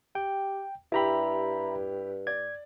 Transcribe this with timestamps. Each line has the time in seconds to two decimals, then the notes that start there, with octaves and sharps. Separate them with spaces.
0.15 G4 G5
0.92 G2 E4 G4 E5 A#5 B5
2.27 D5 G#6